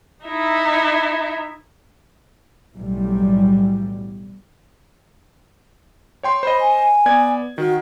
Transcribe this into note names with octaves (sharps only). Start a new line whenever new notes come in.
D#4 E4 E5
B1 A2 E3 F#3 G3
C#5 G5 C6
C5 D#5 B5
G#5
B3 D5 G#6
D#3 F#4